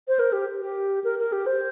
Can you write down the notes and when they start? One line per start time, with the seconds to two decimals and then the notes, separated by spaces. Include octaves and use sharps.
0.08 C5
0.19 A#4
0.33 G4
0.61 G4
1.04 A#4
1.19 A#4
1.32 G4
1.46 C5